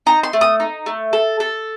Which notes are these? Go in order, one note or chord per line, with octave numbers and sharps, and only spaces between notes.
D#4 A#5
C6
A3
D#6
D#4
A3
A4
A4